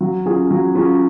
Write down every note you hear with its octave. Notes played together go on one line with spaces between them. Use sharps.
F#3
C#4 F4 G#4
F#3
C#4 F4 G#4